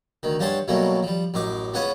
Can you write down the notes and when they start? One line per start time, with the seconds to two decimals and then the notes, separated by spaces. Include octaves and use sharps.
0.23 D2 D#3
0.40 G2 C#4 G4 F#5 A5 C6
0.68 B2 F#3 G3 A3 A#3
1.03 F3 G3
1.34 A1 F#2 D#4 C#6 D6
1.74 C#2 B3 C#4 F4 F#5 G#5